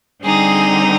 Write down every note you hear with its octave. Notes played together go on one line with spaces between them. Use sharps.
D3 G3 C4 D#4 G#4